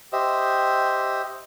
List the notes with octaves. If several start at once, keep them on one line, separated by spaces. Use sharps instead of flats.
G4 C5 D#5 E5